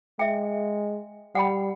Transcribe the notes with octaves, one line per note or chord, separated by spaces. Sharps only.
G#3 E5 G5
G3 F#5 G5 B5